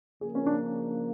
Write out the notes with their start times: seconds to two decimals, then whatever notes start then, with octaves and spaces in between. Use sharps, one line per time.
0.21 C#3 F3 A#3 G#4
0.35 C#4
0.46 D4